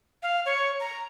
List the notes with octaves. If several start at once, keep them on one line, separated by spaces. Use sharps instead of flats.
F5
C#5
A#5